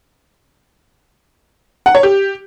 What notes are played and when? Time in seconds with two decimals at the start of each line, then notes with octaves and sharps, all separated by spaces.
1.86 F#5
1.95 C#5
2.03 G4